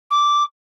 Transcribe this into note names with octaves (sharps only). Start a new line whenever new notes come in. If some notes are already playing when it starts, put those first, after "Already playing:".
D6